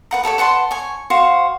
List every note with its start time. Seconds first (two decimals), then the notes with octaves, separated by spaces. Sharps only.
0.11 B4 F#5 A#5
0.23 G4 A4 A#4 C#5
0.38 B4 F#5 A5 C6
0.71 C#5 G#5
1.10 F#4 C5 C#5 F5